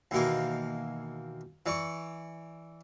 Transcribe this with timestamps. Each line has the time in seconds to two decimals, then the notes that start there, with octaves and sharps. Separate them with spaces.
0.11 D#2 B2 E3 A#3
1.66 E3 D5 C#6